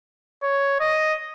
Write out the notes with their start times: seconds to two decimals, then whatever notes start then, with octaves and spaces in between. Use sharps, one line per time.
0.43 C#5
0.80 D#5